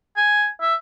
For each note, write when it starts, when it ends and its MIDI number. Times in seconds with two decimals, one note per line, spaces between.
0.17 0.49 80
0.62 0.75 76